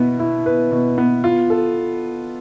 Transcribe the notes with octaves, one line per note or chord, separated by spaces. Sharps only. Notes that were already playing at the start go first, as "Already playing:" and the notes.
Already playing: B2 B3 E4
E4
B4
B2
B3
F4
A4